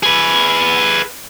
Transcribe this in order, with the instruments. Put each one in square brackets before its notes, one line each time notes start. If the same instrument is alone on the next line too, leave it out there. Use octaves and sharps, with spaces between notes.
[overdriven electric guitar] G#4 B4